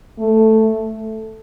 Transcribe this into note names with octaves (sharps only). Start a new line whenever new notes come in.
A3